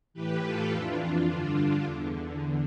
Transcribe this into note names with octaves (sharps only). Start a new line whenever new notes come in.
A2 E3 G4 B4
F4 A4
F2 E3 D4 F4
G2 D3
E2 D3